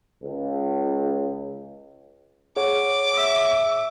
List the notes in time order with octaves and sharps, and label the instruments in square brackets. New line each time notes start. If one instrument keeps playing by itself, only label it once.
[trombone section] C#2
[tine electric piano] G#4 C#5 F#5 [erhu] D6
[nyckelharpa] E5